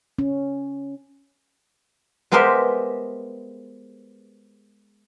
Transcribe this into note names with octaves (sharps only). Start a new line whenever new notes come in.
C#4
G#3 B3 G4 A#4 C5 E5